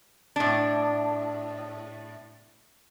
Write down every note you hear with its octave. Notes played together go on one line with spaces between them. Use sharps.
A2 D4